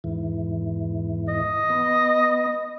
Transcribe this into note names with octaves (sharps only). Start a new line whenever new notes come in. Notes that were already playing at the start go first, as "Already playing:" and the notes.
E2 G#2 E3
D#5
B3